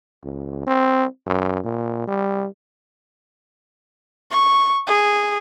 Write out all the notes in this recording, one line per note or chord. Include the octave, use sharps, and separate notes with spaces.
C#2
C4
F#2
A#2
G3
C#6
G#4